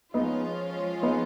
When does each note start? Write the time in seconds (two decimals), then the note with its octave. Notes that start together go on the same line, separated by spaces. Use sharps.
0.14 F3 G#3 B3 C#4 D#4 F4
1.03 B3 D#4